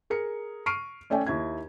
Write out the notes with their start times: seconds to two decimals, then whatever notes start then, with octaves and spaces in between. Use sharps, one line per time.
0.10 G#4 A#4 C#7
0.66 C#6 F6 C7 D7 D#7
1.10 A3 C#4 D5 G5 G#5
1.27 D#2 E4 G#6